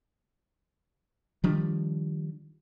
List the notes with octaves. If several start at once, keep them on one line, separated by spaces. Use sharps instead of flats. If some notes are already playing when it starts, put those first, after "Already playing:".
D#3 F3 G3 D4